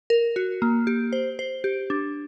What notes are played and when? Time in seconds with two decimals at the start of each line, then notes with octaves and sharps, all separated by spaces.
0.10 A#4
0.36 F#4
0.62 A#3
0.87 G4
1.13 C5
1.39 C5
1.64 G4
1.90 D4